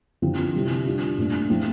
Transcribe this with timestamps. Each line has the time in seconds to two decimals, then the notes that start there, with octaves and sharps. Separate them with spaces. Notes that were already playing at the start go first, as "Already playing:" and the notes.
0.22 D3 F3 C4 F4
0.54 C3 E3 G3
0.86 G3 D4 F4
1.18 A#2 A3 D4
1.50 F3 A3 C4